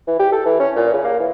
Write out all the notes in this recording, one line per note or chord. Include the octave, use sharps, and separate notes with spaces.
E3
G4
A4
E3
C#4
A#2
C#3
A#3
E3